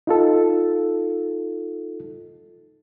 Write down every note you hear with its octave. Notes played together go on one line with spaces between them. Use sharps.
D#4 F4 A4